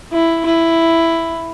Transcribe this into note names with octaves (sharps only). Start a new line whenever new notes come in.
E4
E4